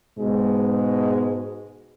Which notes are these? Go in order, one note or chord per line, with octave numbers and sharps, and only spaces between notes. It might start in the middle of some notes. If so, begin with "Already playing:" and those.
G#2 B2 G#3